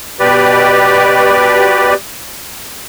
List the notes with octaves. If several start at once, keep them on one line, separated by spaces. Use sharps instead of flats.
B2 G4 B4 D5